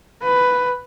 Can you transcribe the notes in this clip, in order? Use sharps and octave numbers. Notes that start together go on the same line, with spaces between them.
B4